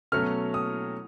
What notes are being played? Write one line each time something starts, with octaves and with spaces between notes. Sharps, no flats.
B2 F#3 A3 C#4 F6
D#6